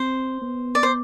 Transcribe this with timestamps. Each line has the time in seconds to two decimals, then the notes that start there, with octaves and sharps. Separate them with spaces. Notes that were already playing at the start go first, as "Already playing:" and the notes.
Already playing: C4 C5
0.42 B3
0.75 D5
0.83 C5